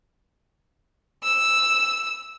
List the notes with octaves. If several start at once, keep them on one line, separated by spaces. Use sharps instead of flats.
E6